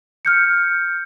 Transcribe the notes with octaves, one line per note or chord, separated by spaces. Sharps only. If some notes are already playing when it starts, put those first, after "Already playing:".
F6 G6 C#7